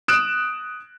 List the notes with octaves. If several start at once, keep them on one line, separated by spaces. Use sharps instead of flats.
D#6 F#6 D7 E7